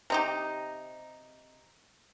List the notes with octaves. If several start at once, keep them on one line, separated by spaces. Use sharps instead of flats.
C3 D#4 G4